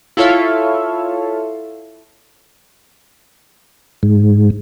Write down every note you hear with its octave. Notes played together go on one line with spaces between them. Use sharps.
E4 F4 A4 C#5 E5 F5
G#2